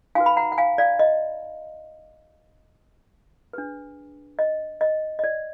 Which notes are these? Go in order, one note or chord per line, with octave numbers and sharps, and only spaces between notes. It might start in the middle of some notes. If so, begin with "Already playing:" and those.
D#4 F#4 B4 F5 G#5
B5
F#5 A#5
F#5
F5 G#5
D5 F5
D#5
D4 G#4 B4
D#5
D#5
D#5
D5